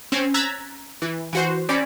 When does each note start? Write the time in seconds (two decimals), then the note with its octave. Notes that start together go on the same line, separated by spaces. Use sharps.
0.12 C4 C#4
0.34 A#5 E6 F#6 G#6 A6 B6
1.02 E3
1.33 E3 F#4 C5
1.69 C4 C#4 D5 B5